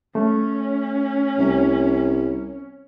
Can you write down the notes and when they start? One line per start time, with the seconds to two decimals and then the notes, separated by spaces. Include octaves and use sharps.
0.15 A3 C#4
1.38 C2